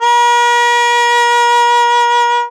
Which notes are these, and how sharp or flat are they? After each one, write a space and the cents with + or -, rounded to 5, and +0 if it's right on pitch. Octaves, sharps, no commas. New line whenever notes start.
A#4 +45